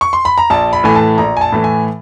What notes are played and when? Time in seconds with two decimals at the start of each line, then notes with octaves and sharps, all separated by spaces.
0.01 C#6
0.13 C6
0.25 B5
0.38 A#5
0.50 A#1 A5
0.73 B5
0.84 A2 E3 A3 G#5
0.95 A5
1.18 A#1 A#5
1.37 G#5
1.41 A5
1.52 A2 E3 A3
1.64 G#5